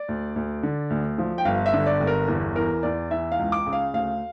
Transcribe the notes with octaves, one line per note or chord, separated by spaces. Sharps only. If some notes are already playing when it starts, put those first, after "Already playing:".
Already playing: D5
D2
D2
D3
D2
F3
G5
G1 F5
E5
D3
D5
G1
A#4
E2
E3 A#4
E2 D5
E3 E5
F5
C#2
D6
C#3
F5
D2 F5